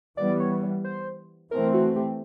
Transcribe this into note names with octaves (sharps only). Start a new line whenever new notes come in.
E3 G3 B3 D5
C#5
C5
E3 A3 C4 A#4
F#4
G4